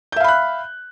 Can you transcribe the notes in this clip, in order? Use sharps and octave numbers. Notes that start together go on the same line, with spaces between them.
E5 F5 B5 F#6 G6